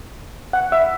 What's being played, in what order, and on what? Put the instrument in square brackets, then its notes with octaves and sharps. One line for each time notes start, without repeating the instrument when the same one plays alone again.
[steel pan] F#5
E5